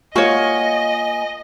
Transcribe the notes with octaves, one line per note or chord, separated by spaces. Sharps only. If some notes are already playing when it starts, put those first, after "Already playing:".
A#3 F4 F#4 C#5 D#5 G#5